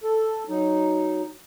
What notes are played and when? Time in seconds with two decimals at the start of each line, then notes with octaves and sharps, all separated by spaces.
0.03 A4
0.49 F#3 D#4